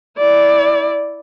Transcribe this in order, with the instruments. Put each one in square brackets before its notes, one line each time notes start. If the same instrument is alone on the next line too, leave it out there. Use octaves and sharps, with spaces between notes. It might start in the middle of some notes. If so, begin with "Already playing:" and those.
[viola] E4 D5